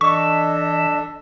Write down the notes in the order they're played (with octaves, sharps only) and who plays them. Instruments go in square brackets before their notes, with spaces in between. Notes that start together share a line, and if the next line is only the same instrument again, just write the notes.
[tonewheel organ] E3 [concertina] D4 A4 [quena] D#5 [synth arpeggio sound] C#6